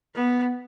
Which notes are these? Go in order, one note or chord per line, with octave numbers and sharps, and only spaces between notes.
B3